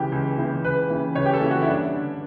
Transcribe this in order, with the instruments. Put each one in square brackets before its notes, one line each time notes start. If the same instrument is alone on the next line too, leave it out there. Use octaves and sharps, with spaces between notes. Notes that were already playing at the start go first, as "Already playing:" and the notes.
Already playing: [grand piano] C#2 C#3 E3 G4
C#2
C#3 E3
C#2 B4
C#3 E3
C#2 C#5
G4
A4
C#3 E3
F#4
E4
G2 D4
D3